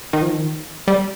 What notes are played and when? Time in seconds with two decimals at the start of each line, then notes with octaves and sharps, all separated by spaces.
0.13 D#3
0.22 F3
0.31 D#3
0.88 G3